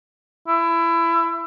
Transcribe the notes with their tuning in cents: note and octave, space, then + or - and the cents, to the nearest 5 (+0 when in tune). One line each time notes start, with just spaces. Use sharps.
E4 +25